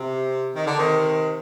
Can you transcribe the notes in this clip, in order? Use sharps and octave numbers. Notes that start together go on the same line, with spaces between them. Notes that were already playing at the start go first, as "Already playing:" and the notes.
Already playing: C3
D#3
D3
C3 D#3